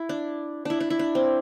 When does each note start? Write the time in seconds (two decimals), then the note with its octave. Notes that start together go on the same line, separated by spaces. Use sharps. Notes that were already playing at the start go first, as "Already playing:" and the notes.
Already playing: E4
0.09 D4
0.65 D4 E4
0.80 D4
0.90 E4
0.99 D4
1.15 C4